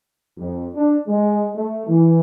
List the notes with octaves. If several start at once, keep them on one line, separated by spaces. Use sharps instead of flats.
F2
D4
G#3
A3
E3